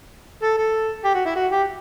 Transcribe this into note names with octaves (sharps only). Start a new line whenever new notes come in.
A4
A4
G4
F#4
E4
F#4
G4